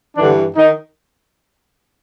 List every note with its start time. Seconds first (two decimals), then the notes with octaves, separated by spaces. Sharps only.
0.16 G2 D3 E3 D4
0.57 D#3 D#4